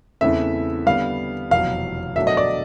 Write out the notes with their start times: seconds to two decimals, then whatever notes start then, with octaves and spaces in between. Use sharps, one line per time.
0.21 E2 C#3 E3 A3 C4 E5
0.86 D3 G3 B3 F5
1.50 F1 E2 B2 F#3 F5
2.16 B2 F#3 A3 D4 F#4 E5
2.27 D#5
2.37 D5